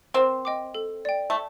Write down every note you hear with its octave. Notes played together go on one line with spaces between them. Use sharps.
C4 A#4
D#5 G5 D6
A4
D5 G5
A3